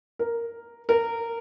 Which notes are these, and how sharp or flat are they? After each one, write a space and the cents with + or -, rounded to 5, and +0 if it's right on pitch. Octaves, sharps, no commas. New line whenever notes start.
A#4 -5
A#4 -20